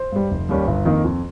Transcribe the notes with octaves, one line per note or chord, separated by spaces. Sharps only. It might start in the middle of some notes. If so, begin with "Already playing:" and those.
Already playing: C5
G2 G3
F1
D#2 D#3 G3 C#4
G1
F2 D#3 A#3 D#4
F2